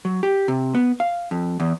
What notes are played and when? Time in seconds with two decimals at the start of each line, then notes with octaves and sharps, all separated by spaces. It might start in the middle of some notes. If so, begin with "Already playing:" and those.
0.05 F#3
0.23 G4
0.48 C3
0.75 B3
1.00 F5
1.31 F2
1.60 E2